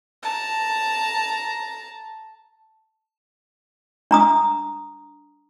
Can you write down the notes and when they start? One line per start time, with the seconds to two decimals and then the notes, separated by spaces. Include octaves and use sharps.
0.22 A5 A#5
4.11 D4 A#5 D#6